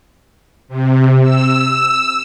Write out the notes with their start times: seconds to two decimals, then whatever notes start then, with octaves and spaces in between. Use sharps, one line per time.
0.68 C3
1.22 E6